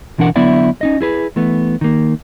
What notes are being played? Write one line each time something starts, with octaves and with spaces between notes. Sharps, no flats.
B1 E3 D4 A#4 F#5
D3 F#3 B3 E4 D5 E5
C#4 D#4 D#5
E4 G#4 B4
E3 A3 B3
D#3 A#3